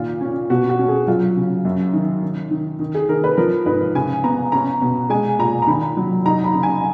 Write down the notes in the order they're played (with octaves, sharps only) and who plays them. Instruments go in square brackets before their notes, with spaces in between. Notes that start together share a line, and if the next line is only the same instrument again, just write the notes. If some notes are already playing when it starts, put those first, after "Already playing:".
Already playing: [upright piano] A#2 D#3 F4
C#4
B2 F#4
F#4
C#4
G#4
F#3 F4
C#3
F#2
D#3
D#3
D#3
D#3
G#4
D#3 A#4
B4
F3 A#4
G#2 B4
C#3 G#5
B3 A#5
C#4 A#5
B2
G#3 G#5
A#2 A#5
A#5
D#3 B5
F#3
D#4 A#5
B5
C#3
G#5